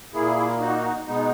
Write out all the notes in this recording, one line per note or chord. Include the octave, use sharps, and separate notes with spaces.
A#2 A#3 E4 G#4
D#4 F#4
B2 G#3 B3 D#4